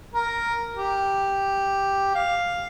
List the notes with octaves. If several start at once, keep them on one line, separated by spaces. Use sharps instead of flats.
A#4
G4
F5